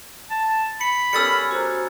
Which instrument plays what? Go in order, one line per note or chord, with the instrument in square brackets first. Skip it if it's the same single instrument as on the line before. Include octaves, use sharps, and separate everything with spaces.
[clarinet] A5
[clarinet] B5 [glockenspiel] C#7
[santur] G3 B3 C#4 [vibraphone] A4 A#4 [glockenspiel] E6 A6 C#7
[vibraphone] F#4 C5 A#5